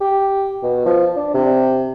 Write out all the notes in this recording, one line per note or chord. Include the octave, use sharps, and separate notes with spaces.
G4
B2
F3
D4
C3